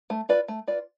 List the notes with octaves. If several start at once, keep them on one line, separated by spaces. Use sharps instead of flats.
A3
F4 B4 D5
A3
F4 B4 D5